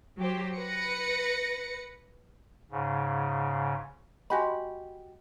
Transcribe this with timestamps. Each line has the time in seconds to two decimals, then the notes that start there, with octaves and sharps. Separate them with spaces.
0.18 F#3 G4 C5
0.58 B4 A#6 C#7
2.71 G#2 C#3
4.30 F#4 G4 D#5 G#5 B5 C6